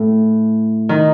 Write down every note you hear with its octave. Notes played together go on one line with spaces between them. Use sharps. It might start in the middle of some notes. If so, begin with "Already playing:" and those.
Already playing: A2
D#3